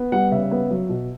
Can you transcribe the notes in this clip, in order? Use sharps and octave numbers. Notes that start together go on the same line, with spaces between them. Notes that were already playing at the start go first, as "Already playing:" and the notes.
Already playing: B3
G3 F#5
C#3 E5
B3
F#3
B2